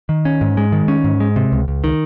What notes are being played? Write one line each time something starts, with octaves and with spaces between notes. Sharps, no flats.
D#3
C#4
G#2
G#3
D#3
C#4
G#2
G#3
C3
C#2
C#2
D#3